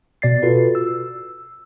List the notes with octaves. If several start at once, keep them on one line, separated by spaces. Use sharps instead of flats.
B2 D5 A6 C7
F4 F#4 A4 B4
E6